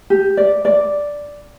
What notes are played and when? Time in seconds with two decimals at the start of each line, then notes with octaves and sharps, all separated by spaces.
0.10 G4
0.37 D5
0.65 D5